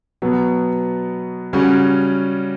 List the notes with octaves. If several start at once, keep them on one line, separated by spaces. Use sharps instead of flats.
B2 F#3 B3
C#3 G3 C#4 F#4